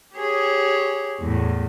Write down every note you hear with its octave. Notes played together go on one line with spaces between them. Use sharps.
G4 G#4 C#5
E2 A2